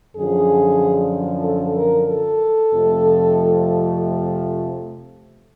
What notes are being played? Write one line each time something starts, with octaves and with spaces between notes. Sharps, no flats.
F#2 D3 F3 G#4
A4
A#4
A4
F2 C3 F3 A3